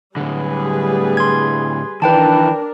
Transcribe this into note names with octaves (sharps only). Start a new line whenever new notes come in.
A2 D3 G3 G#4 B4
C6 G#6
D#3 E3 D4 A#4 B4 G5 A5